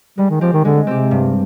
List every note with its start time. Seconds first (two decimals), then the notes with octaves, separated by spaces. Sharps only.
0.18 G3 G#3
0.30 D#3
0.41 F3 C4 G4
0.53 D#3
0.64 D3 G#3
0.87 C3 C4 G4
1.11 G2